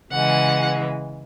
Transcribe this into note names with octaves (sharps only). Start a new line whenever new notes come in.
C#3 E3 G#3 F#5